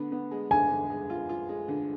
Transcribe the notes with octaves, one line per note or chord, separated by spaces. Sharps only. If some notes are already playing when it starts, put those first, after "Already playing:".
Already playing: D3 B3
B3
G#3
D3 G#5
D3
G#3
F4
F4
G#3
D3